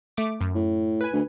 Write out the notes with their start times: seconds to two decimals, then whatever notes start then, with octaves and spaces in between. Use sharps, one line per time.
0.17 A3 D6
0.41 F#2
0.55 A2
1.01 B4 G#5
1.13 D2